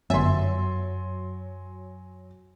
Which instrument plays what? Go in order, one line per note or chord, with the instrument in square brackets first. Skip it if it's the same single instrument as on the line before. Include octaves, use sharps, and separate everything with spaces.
[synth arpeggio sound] G1 E5 [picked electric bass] F#2 [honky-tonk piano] F#3 A6 [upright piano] G#5 C6